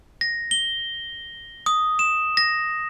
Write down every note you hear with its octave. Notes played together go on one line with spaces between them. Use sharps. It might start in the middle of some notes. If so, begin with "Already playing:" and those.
A#6
G7
D#6
E7
A#6